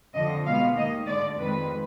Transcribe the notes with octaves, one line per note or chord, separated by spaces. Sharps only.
F2 D3 F3 D#5
B2 G#3 B3 F5
D#2 D#3 A#3 D#5
D2 D3 G#3 D5
F2 D#3 G#3 B4